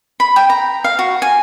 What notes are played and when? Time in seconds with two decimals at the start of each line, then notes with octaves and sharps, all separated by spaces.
0.20 B5
0.36 G5
0.50 A#5
0.84 F5
0.99 F#4
1.22 G#5